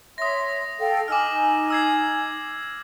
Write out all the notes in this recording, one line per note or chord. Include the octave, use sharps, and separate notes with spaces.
C#5 E5 C6 D#6 A#6
A4 F5 G5
D#4 G#5 D6 E6 F6
E6 G#6 C7